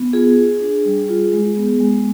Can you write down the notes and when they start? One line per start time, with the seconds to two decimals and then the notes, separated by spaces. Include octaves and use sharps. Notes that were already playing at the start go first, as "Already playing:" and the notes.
Already playing: B3
0.13 F4 G#4
0.38 F4
0.61 D4
0.85 G3
1.09 F4
1.33 G#3
1.57 B3
1.80 G#3